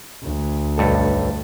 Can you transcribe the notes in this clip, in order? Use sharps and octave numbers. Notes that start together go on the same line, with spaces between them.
D2
B1 G2 A4